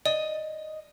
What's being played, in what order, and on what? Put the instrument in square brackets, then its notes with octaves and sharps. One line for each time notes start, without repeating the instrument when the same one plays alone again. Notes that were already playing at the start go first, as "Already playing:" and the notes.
[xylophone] D5 [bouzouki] D#5